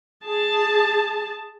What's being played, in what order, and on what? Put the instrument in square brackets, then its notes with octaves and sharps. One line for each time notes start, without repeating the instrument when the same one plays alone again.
[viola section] G#4 A5